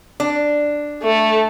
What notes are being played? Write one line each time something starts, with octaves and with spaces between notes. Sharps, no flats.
D4
A3